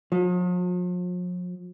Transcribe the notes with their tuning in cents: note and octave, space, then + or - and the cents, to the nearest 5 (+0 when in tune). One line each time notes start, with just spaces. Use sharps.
F3 +45